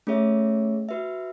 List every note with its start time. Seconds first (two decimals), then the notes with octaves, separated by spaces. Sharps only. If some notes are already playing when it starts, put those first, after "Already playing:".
0.07 A3 C#4 G#4 C#5 E5
0.89 F#4 B4 E5